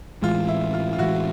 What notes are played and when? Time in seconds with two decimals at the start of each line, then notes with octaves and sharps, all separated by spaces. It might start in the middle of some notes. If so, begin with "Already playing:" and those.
0.22 A2 E3 G#3 F4
0.48 E4
0.74 F4
0.93 F4
0.98 A2 E3 G#3 E4 F#4